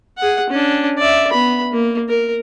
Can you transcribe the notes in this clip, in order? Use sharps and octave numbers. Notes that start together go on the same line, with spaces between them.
G#4 F#5
C#4 D4
D5 E5
B3 B5
A#3
A#4